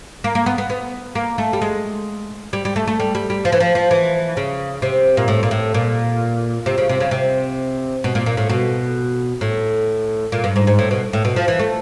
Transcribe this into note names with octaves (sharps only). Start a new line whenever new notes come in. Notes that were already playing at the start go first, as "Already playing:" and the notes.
A#3
A#3
B3
B3
B3
A#3
A3
G3
G#3
G3
G3
A3
A3
G3
G3
G3
F3
E3
F3
F3
E3
C#3
C3
A#2
A2
A#2
A2
A#2
C3
C#3
C3
C#3
C3
B2
A#2
A#2
A2
B2
A2
A#2
G2
G#2
G#2
A2
B2
A2
B2
F3
E3
A3